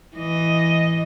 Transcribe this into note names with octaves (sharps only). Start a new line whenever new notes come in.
E3 D#5